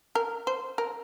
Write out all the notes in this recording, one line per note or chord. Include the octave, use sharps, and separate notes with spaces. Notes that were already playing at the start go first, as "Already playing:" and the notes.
A#4
C5
A#4